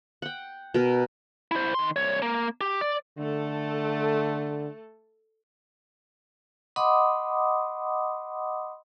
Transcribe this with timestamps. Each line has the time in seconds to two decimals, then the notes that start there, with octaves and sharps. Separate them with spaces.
0.22 F#5 G5
0.74 B2 A#4
1.51 E4 C5
1.74 D#3 C6
1.96 C2 C#5
2.22 A#3
2.61 G4
2.81 D5
3.18 D3 A3 A4
6.76 D#5 F#5 B5 C6 D6 D#6